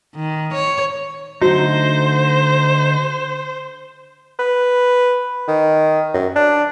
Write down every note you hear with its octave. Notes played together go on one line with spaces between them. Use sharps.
D#3
C#5
D3 F#3 A3 D#4 C5
B4
D#3
F#2
D4